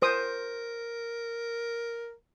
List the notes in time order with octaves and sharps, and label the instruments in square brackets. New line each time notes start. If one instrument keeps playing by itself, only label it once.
[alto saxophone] A#4 [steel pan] C5 D#6